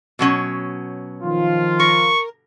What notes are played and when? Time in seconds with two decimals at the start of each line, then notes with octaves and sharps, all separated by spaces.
0.19 B2 F#3 C#4
1.23 D#3 F3 F4
1.80 A#4 C#6